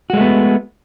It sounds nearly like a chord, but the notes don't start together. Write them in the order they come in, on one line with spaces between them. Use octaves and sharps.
F#4 G#3 A3 B3